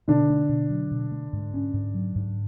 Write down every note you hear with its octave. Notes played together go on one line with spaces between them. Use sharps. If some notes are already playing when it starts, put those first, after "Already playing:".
B2 D3 D4
A3
B2
F#3
B2
A3
G#2
C#4
G#2
F#3
G#2